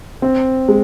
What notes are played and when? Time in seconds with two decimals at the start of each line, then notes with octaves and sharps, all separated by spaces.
0.22 C4
0.68 G#3